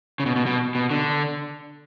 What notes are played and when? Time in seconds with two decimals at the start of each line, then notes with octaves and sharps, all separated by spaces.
0.20 C#3
0.26 B2
0.36 B2
0.46 B2
0.75 B2
0.90 D3